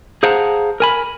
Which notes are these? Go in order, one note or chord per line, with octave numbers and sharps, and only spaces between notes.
G#4 C5 F5 F#5 A5 A#5
A#4 G#5 B5